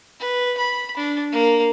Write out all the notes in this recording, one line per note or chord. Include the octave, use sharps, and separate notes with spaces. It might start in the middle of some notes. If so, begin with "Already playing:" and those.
B4
B5
D4
A#3